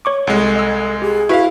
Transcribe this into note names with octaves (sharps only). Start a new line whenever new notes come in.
C#5 C#6 D6
C2 G#3 A4
D#5 E6
G4 G#4
E4 F#4 B4 E5 F5